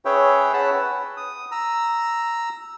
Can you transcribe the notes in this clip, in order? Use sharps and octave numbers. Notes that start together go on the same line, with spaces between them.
C#4 G#4 B4 C#5 E5 G5
C#4 F#5 A5 B5
B4
D#6
A#5 E6